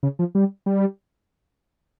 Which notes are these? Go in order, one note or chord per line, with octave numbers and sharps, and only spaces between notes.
C#3
F3
G3
G3